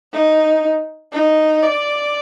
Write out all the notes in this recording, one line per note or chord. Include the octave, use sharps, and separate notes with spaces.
D#4
D#4
D5